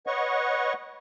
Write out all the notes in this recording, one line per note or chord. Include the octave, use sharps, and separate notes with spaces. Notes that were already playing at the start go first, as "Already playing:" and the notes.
B4 C#5 D#5 F#5 C#6